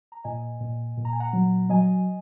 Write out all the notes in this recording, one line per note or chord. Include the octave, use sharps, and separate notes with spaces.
A#5
A#2 D#5 G#5
A#2
A#2
A#5
G#5
F#5 A#5
F#3
F#3 D#5 G#5